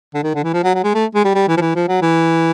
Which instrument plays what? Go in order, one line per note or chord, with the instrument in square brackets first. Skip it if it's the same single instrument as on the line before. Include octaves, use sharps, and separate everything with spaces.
[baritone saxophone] D3
D#3
D3
E3
F3
F#3
F#3
G#3
A3
G#3
G3
G3
E3
F3
E3
F3
F#3
E3